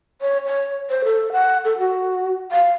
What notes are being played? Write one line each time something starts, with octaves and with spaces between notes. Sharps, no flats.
C#5
C#5
C5
A4
F#5
A4
F#4
F5